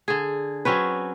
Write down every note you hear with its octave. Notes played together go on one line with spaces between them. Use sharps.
D3 G#4
F#3 C4 C#4 B4